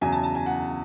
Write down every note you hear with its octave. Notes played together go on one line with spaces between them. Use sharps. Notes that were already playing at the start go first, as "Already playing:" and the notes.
E2 C#3 F#3 G#5
A5
A5
G#5
F#5